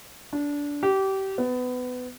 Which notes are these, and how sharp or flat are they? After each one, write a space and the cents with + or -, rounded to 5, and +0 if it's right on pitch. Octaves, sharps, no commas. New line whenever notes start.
D4 -20
G4 -25
B3 +25